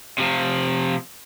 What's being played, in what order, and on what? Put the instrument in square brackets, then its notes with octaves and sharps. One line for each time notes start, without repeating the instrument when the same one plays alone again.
[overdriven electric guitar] C3 F3